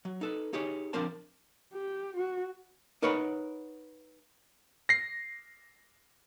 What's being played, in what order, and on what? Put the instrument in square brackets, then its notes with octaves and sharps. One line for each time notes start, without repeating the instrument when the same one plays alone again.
[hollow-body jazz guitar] F#3
D#4 A4 B4
D#4 G4 G#4 C#5
F3 C4 D4 A#4 C5 A5
[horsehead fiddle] G4
F#4
[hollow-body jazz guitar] D#4 A#4 B4 C#5 F#5 B5
[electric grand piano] A#6 C7